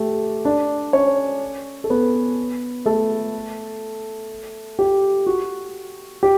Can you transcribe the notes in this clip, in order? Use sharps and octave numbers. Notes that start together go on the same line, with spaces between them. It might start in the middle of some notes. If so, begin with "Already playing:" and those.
Already playing: A3 G4 A4
D4 D5
C#4 C#5
A4
B3 B4
A3 A4
G4
F#4
G4